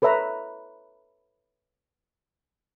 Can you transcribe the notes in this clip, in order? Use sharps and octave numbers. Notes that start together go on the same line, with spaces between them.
A4 B4 C#5 E5 A#5